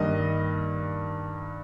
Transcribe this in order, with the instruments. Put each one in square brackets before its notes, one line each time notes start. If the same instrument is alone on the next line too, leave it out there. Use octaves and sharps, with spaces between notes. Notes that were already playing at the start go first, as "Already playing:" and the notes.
Already playing: [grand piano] G2 D#3 A#3 D#5